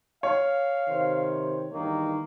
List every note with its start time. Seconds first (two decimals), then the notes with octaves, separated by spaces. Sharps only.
0.23 C#5 F5
0.88 C3 D#3 C5
1.73 E2 G2 D#3 A#3